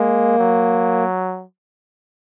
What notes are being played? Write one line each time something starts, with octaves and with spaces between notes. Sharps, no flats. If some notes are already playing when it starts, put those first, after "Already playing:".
Already playing: G#3 A#3
F#3